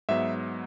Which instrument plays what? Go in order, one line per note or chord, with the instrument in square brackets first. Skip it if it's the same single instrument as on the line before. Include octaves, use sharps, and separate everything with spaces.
[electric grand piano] G#2 F#3 B3 E5